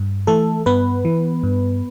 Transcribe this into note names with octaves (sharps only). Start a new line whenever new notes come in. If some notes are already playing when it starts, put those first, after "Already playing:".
Already playing: G2
E3 A3 A4
G2 B3 B4
E3
G2